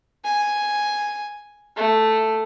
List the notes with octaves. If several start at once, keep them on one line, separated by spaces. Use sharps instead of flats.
G#5
A3